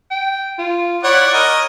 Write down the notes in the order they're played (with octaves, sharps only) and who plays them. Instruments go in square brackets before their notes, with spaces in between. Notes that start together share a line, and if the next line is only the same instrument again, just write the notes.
[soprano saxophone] G5
F4
[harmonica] E4 D5 F#5 [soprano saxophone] C#5
[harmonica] A#4 D#5